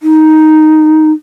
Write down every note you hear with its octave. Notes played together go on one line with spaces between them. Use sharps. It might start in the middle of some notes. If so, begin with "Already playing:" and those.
D#4